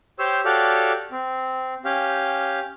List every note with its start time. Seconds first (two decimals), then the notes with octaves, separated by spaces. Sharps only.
0.19 G4 C5 C#5 E6
0.45 F#4 G4 A4 C#5 D5 F5
1.12 C4
1.85 C#4 G4 F5